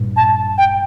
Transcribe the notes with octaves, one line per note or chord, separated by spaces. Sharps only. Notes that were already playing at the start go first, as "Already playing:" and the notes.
Already playing: G2 A#2
A5
G5